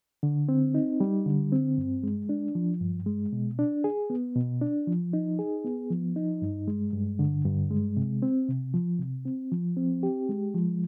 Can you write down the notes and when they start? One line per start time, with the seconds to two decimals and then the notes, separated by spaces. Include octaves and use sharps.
0.23 D3
0.49 C4
0.75 D#4
1.00 G3
1.26 D3
1.52 C4
1.78 G2
2.03 G#3
2.29 D4
2.55 F3
2.81 G2
3.06 G#3
3.33 B2
3.59 D4
3.84 G#4
4.10 B3
4.36 B2
4.62 D4
4.87 F3
5.13 D#4
5.39 G#4
5.64 B3
5.90 F3
6.16 D#4
6.42 G2
6.68 G#3
6.93 G2
7.19 D3
7.45 G2
7.71 G#3
7.97 C3
8.22 C4
8.48 C3
8.74 F3
8.99 C3
9.25 C4
9.52 F3
9.77 C4
10.03 G4
10.29 G#3
10.54 F3